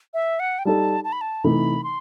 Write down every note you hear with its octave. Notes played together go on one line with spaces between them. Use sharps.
E5
F#5
G5
G3 D#4 A4 A5
A5
B5
A5
C3 E3 A3 D#4 B5
C6